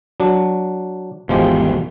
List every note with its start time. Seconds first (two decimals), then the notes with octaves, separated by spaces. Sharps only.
0.20 F#3 D4
1.29 G#1 E2 B2 F3 G#3 G4